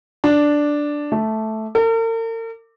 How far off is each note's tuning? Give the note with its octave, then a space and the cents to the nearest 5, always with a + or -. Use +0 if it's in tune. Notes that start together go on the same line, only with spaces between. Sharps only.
D4 +0
A3 -5
A#4 -45